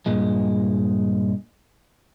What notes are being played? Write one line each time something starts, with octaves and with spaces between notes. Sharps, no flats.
G2 A#2 G#3